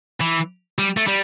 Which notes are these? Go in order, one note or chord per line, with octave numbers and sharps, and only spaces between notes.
E3
G3
A3
G3